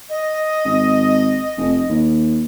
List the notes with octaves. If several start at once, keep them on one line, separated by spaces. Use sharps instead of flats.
D#5
G#1
F1
D#2